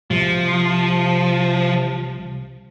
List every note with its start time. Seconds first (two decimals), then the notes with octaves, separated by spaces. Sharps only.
0.11 C2 C3 F3